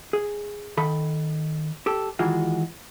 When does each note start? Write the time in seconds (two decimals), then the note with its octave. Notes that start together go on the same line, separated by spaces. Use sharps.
0.13 G#4
0.77 D#3 A4 B5
1.86 G4 A4
2.19 D#3 E3 G#3 F4 F#4